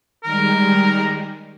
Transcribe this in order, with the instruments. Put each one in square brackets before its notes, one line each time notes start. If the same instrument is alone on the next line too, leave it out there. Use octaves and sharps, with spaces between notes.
[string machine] D#3 G3 G#3 [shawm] A#4